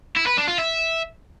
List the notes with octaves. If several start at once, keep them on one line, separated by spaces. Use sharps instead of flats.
E4
B4
D4
F4
E5